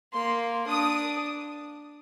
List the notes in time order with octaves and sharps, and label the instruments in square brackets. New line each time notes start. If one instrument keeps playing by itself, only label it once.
[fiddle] A#3 [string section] C6
[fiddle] D4 [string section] D#6